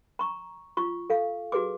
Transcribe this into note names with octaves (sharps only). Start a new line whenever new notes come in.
A#5 C#6
F4 C#6
A4 F5
F#4 G#4 B4 D6